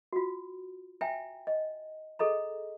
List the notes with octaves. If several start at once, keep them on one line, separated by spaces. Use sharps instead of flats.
F4 F#4
E5 G5 G#5 A#5
D#5
G#4 A4 D#5 A#5